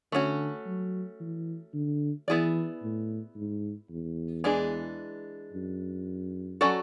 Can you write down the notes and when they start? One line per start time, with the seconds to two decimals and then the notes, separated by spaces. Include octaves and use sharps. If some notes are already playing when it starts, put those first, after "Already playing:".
0.12 D3 A3 C#4 F#4
0.66 F#3
1.20 E3
1.74 D3
2.28 E3 B3 E4 G#4 D5
2.83 A2
3.36 G#2
3.91 E2
4.44 E3 G#3 D4 G#4
5.53 F#2
6.61 F#3 C#4 F#4 A4 D5